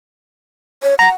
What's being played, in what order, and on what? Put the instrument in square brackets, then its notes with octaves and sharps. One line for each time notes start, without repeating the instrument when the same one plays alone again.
[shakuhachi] C#5
[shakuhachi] F#5 [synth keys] A#5